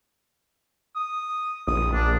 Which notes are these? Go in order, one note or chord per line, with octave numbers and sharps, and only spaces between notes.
D#6
A#1 D#6
D4